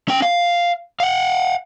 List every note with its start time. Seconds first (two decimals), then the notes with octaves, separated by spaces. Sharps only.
0.08 C#4 G5
0.22 F5
1.00 F5 F#5